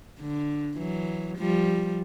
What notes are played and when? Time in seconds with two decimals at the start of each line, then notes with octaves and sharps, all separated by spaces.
0.20 D3
0.78 E3 F#3
1.38 F3 G3